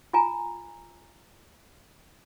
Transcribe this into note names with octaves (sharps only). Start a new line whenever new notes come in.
F4 G#5 A#5